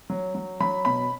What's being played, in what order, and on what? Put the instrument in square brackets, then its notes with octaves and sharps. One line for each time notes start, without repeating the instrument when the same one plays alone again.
[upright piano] F#3
F#3
F#3 B5
B2 B5